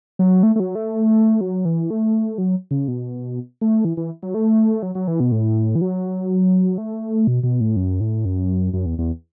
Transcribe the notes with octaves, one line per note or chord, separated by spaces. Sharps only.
F#3
A3
A3
F#3
A3
F#3
E3
A3
F#3
C#3
B2
A3
E3
E3
F#3
A3
F#3
F#3
E3
B2
A2
E3
F#3
A3
B2
B2
A2
F#2
A2
F#2
F#2
E2
E2